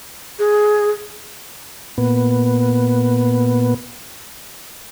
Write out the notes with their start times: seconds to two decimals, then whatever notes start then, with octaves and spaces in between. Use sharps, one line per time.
0.39 G#4
1.98 A#2 B3